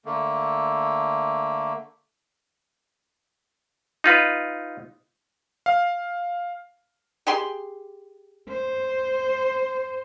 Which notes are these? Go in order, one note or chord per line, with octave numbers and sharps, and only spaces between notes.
D3 A3 A#3
D#4 F4 B4
F5
G4 G#4 C6
C5